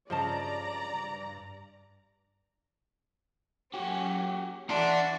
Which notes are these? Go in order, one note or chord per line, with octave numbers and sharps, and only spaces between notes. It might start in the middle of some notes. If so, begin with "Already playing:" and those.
G2 C#3 F3 C5 D5 D#5 A5 A#5
F#3 A#3 C#4 F#4 G4
E3 D4 F#4 D5 F#5 C6